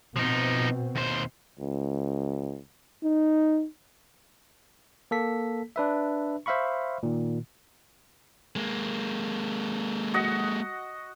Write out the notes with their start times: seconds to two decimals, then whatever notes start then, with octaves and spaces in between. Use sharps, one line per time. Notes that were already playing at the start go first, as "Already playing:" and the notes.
0.16 B2 F3 C4 D#4
0.96 D#2 C5
1.59 C#2
3.03 D#4
5.11 A#3 A4 B6
5.76 D4 B4 E5
6.46 C5 E5 F5 B5 C#6
7.03 A#2 D#3
8.56 G#3 A#3
10.14 F#4 D#5 F#5